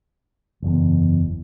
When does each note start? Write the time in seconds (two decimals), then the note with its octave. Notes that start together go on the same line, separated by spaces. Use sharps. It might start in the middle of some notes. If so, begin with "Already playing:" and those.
0.62 F#1 E2